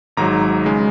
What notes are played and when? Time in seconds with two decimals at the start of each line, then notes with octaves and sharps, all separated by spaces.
0.17 G#1 G#2 F#3 A#5
0.66 C#3 G#3